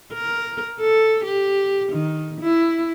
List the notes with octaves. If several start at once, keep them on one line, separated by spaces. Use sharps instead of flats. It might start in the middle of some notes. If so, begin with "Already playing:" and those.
A#4
A4
G4
D#3
E4